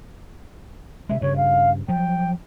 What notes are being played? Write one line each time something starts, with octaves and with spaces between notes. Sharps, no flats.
C3 G#3 E5
G2 C#3 C#5
F5
F3 F#3 G5